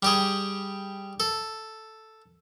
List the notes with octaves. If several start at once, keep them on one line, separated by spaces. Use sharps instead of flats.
G3 G4 G#4
A4